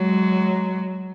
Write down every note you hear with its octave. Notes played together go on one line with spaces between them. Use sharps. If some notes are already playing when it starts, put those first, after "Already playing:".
Already playing: F#3 G#3